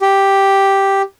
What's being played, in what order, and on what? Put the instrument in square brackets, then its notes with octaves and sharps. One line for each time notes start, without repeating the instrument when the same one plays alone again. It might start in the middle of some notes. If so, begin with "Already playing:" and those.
[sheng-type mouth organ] G4